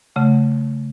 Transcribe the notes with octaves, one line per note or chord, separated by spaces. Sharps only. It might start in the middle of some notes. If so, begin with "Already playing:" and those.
C#3 A3 F#5